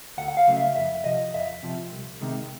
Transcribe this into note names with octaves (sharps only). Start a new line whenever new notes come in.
D2 F#5
F#5
F5
C#3 F#3 A3
E5
F2 E5
C3 F3 D#5
F2 E5
C3 F3
C2
C3 D#3 G#3